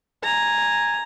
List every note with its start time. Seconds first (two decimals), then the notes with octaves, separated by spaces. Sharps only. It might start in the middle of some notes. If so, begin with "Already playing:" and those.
0.24 G#5 A#5